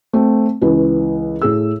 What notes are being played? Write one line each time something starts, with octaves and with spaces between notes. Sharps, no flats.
A3 C4
C#2 E3 B4
A2 G#4 E6